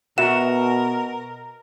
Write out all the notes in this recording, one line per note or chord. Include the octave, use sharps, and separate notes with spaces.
B2 F#4 A#4 E5 F#5 E7